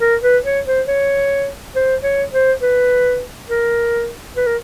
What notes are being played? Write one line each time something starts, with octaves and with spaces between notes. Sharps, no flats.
A#4
B4
C#5
C5
C#5
C5
C#5
C5
B4
A#4
B4
A#4